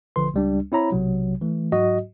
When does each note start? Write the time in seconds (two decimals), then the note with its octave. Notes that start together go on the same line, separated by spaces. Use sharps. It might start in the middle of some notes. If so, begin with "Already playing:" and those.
0.16 A1 D3 F3 B4 C6
0.34 C#2 G3 D4
0.72 C4 E4 C#5 A#5 B5
0.92 B1 C3 F#3
1.41 E3 A3
1.72 G#2 F#3 F#4 D#5